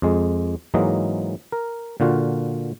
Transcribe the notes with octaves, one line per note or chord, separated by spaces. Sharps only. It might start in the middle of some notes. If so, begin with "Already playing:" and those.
F2 G#3
G#2 E3 F#3 G#3 A#3 D#5
A#4
A#2 D3 F4 F#4